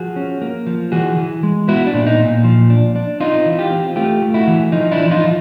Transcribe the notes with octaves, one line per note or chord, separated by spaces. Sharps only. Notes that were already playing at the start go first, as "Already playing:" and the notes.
Already playing: F3 F#4 G#4
C#4
A#3
F3
E3 F#4 G#4
E3
G#3
B3 E4 F#4
D4
A#2
D#4
A#2
F3
D4
D4
C4 D#4 F4
E3
F4 G4
C4
A3 F4 G4
A3
E4 F#4
E3
F3 D#4
D4 E4
F3
D#4 F4
F3